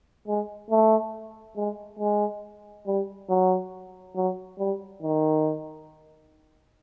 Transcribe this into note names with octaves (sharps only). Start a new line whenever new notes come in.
G#3
A3
G#3
G#3
G3
F#3
F#3
G3
D#3